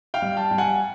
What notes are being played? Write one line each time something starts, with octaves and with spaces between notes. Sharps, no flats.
F5 G5
G3
G5 A5
G3
F#5 G#5